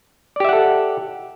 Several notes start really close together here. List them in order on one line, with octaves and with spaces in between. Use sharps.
D5 G4 E5 F#5 A4